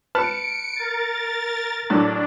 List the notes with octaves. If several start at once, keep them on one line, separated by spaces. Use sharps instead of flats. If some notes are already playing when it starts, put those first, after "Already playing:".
B4 A5 F6 C#7 D7
A#4 A6
A2 F#3 D4